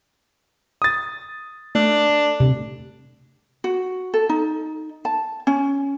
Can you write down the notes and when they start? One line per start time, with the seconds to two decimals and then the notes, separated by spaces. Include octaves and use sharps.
0.82 D#6 A6
1.75 A3 D4
2.40 C3
3.64 F#4
4.14 A4
4.29 D#4
5.05 A5
5.47 C#4